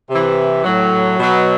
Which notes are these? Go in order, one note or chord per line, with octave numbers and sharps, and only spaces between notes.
C3 E3
A2 F#3
B2 F#3